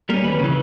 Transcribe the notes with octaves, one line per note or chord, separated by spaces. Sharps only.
G3 A#3 C#4 A#4
D#2 B4
C#3 E3